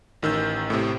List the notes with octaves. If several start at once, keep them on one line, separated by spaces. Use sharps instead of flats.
A1 D#3 E6 G6
A2 C3